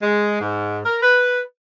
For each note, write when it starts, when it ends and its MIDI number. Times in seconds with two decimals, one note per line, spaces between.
0.02 0.38 56
0.41 0.80 44
0.85 0.98 70
1.02 1.40 71